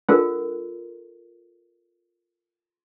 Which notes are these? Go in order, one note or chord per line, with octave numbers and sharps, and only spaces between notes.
G#3 D4 F4 A4 A#4 F#5